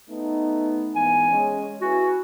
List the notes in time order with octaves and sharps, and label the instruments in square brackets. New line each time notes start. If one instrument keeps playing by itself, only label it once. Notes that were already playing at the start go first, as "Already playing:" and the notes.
[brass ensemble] A3 B3 D#4
[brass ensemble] G#2 E3 B3 [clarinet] G#5
[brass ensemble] G#3 C#4
[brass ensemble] E4 B4 G#5 [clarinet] F#4